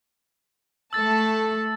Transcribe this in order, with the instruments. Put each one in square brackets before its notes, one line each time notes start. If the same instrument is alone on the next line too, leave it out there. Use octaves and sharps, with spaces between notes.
[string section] A3 A4 A5 [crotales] E6 A6